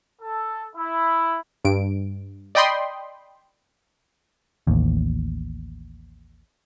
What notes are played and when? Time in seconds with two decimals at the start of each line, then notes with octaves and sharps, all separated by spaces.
0.21 A4
0.76 E4
1.64 G2 D7
2.55 D5 D#5 G5 B5 C6 D#6
4.67 A1 D#2